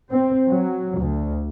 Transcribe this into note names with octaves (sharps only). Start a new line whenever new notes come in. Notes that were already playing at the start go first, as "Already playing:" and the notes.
C4
F#3
D2